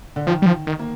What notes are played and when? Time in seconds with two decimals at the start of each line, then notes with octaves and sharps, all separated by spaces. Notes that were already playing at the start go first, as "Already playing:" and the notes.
0.16 D3
0.27 D#3 F3
0.42 G3
0.46 F3
0.67 D#3
0.79 A#3